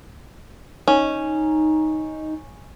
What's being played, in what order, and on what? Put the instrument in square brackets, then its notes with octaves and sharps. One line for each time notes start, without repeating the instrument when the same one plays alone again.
[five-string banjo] C#4 [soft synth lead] D#4